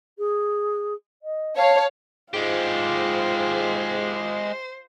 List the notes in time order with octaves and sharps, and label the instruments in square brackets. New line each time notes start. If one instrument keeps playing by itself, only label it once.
[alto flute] G#4
D#5
[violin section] C#5 F5 [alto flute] A5
[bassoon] G#2 [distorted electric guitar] G#3 G4 [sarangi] F4 [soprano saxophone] C5